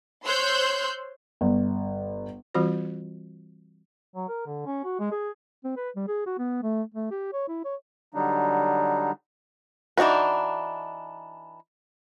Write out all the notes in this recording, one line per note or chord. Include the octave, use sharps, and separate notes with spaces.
C5 C#5 C6 E6 F#6 G6
G1
E3 G3 C4 F4 F#4 C5
F#3
A#4
D3
C#4
F#4
G#3
G#4
C4
B4
G3
G#4
F#4
B3
A3
A3
G4
C#5
E4
C#5
D3 F#3 G3 D4 D#4
E3 D4 D#4 F#4 B4